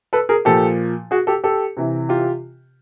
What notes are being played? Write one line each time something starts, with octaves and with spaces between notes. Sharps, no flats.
A4 B4
G#4 A#4
A#2 F3 G4 A4
F#4 G#4
G4 A4
G4 A4
C3 E3
F4 G4